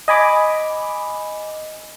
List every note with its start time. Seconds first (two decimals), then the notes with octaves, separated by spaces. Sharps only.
0.08 D#5 G#5 B5 D6